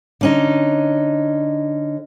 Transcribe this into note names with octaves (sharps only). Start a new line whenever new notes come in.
D3 C#4 D#4